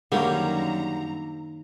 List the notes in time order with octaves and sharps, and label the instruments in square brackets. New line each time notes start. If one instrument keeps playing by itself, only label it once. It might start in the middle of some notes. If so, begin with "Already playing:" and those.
[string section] F#2 A#5 [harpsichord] D3 G3 [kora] D#3 A#3 C#4